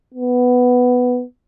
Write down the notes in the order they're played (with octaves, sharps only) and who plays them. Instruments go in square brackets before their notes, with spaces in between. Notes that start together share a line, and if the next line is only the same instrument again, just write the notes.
[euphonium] B3